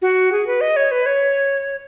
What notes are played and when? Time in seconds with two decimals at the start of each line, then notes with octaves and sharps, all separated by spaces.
0.02 F#4
0.32 G#4
0.47 B4
0.61 D#5
0.76 C#5
0.92 B4
1.06 C#5